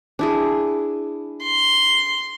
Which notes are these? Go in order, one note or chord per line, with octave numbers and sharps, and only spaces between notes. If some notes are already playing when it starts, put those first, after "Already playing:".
D4 E4 G#4
C6